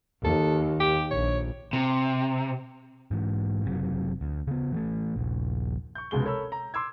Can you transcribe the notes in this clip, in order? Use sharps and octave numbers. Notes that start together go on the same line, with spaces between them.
D#2 A4
G4
A#1 C#5
C3
G#2 E3
F#1 C3 F#3
D2
C#3 B3
E3 G#3 A3
D#1 A#1
C#6 G6
F1 C#2 B2 G#3 G7
A4 A#4 C#5 B5 E6
A#5
C6 D6 E6 G#6